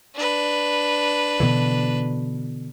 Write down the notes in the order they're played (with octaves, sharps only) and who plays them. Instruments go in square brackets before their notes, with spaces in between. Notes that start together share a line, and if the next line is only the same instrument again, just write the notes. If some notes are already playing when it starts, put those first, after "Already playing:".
[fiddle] D4 B4
[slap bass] B2 D3 E3